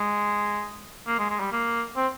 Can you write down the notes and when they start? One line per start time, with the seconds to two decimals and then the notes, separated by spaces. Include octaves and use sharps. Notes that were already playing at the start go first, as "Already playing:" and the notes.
Already playing: G#3
1.07 A#3
1.19 G#3
1.29 G#3
1.40 G3
1.52 A#3
1.96 C4